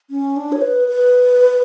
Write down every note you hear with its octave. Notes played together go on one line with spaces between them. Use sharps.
C#4
D4
C#5
B4
B4